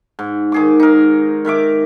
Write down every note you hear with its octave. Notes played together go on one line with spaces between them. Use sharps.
G#2
D#3 G#4 D6
D#4 A#4
D#3 A#4 E5 D6